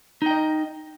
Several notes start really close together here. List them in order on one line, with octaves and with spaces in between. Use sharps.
D#4 G5 D#5